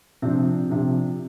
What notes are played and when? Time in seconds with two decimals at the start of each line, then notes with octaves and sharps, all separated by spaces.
0.22 C3 F3 C4 D4
0.70 C3 F3 D4